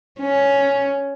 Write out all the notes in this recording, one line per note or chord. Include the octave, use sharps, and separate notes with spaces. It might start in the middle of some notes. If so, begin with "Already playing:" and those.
C#4